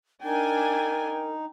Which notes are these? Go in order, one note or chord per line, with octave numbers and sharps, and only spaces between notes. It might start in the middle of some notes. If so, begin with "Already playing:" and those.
D4 D#4 A#4 G5 G#5